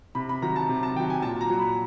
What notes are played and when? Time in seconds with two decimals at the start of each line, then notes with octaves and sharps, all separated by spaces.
0.15 C3 B5
0.29 B5
0.42 D#3 F#3 A#5
0.56 A5
0.69 C3
0.83 A5
0.96 D#3 G5
1.00 F#3
1.10 G#5
1.22 A#2 A5
1.41 A#5
1.50 F#3
1.59 B5